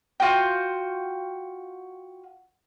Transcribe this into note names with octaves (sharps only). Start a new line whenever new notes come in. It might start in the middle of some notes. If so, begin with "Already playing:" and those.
F4 F#4 F#5 G5